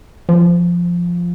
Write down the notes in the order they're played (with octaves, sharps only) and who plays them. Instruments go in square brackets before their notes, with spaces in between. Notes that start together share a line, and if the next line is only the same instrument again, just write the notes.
[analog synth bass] F3